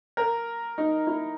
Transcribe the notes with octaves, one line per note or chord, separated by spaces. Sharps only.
A#4
D#4
E4